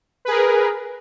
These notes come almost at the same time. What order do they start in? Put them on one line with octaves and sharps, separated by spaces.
B4 G#4 A#4